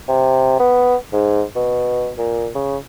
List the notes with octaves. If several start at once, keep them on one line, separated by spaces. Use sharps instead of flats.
C3
B3
G#2
B2
A#2
C#3